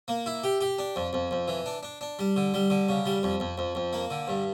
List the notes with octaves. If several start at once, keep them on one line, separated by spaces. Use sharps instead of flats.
A#3
E4
G4
G4
D4
F2
F2
F2
E3
D4
D4
D4
G3
D3
G3
D3
C#3
G3
F2
F2
F2
F2
A#3
D3
G2